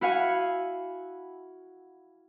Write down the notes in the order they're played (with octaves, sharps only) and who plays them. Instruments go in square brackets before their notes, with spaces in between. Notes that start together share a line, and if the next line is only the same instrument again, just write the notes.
[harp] E4 F#4 F5 F#5 G#5